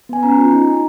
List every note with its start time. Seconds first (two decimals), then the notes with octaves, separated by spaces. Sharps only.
0.09 B3 G#5
0.23 C#4 A#5
0.38 F4
0.53 D#4
0.67 D#4